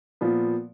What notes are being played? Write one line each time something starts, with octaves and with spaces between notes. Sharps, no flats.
A#2 F3 B3